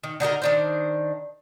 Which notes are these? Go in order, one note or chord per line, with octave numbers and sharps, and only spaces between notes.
D#3
D3 D#4 F#4 A#4
D#3 D4 C5